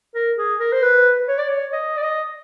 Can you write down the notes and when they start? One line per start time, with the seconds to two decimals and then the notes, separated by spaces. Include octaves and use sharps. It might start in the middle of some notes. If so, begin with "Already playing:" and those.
0.15 A#4
0.38 G#4
0.60 A#4
0.72 C5
0.82 B4
1.28 C#5
1.38 D5
1.48 C#5
1.73 D#5
1.97 D5
2.02 D#5